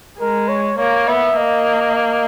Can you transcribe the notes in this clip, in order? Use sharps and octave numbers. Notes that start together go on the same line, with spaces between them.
G#3 A#4
C#5
A#3 C#5
B3 E5
A#3 D#5
D#5